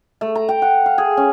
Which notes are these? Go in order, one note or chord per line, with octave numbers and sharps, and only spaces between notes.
A3
A#5
G5
F#5
F5
G#4
C#4